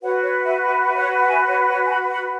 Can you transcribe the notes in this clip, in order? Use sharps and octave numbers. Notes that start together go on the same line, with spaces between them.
F#4 B4 C#5 F#5
C#5
E5
E5
E5
C#5 F#5
F#5
E5 G#5
C#5 F#5
C#5
G#5
F#5 B5
F#5 B5